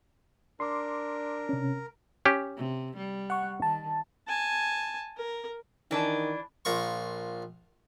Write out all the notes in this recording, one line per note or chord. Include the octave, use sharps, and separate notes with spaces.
D4 A#4 C6 D6
C3 C#4
C#4 G4
C3
G3
F#5 C#6
D#3 A5
G#5 A5
A#4
D#3 E3 D4 A5
A#1 F4 A#4 C#6